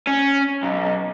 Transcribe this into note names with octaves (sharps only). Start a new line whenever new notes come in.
C#4
B1